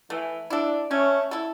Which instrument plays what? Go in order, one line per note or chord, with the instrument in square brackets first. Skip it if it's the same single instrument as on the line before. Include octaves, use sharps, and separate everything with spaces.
[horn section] E3 [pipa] A3
[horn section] D4 [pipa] E4 A4
[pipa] A3 [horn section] C#4
[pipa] E4 A4